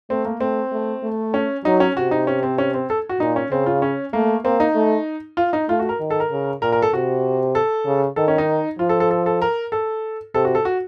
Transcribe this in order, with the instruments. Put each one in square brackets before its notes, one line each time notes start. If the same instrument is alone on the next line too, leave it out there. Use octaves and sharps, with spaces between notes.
[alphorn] A3 [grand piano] C4
[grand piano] A#3
[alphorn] A3 [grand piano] C4
[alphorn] A3
A3
[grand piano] C#4
[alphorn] F#3 [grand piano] D#4
[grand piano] C#4
[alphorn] C3 [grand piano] F#4
[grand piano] D#4
C#4
C4
C#4
C4
A4
F#4
[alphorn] A#2 [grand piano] D#4
[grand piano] C#4
[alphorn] C#3 [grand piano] C4
[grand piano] F4
C#4
[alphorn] A3 [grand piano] A#3
[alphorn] A#3 [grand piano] C4
[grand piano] D#4
[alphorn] A3
[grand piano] F4
D#4
[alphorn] A3 [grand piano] F4
[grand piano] F#4
A#4
[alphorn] D#3
[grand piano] A4
A#4
[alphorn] C#3
[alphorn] A#2 [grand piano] A#4
[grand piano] A#4
A4
[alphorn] C3 [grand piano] F#4
[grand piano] A4
[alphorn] C#3
[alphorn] D#3 [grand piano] A4
[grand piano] C#4
D#4
[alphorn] F3 [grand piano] F4
[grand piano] A4
A4
A4
A4
A#4
A4
[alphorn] C3 [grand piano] A4
[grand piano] F#4
A4
F#4